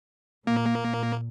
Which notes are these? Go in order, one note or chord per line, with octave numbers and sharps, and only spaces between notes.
A#2 A#3